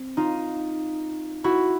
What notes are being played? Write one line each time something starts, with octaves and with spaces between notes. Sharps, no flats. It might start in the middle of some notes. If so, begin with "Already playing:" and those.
Already playing: C4
D#4 F4
E4 F#4